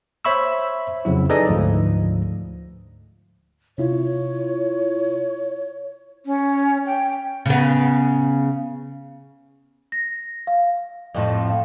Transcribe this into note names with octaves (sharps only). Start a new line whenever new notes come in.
C5 C#5 E5 B5 C#6 E6
F2 C#3 F#3 E4
D#4 G#4 A4 B4 D5 D#5
D2 G#2 F3
C3 E4 F4 C#5
C#4
G5
C#3 B3
A#6
F5
F2 A2 F3
F5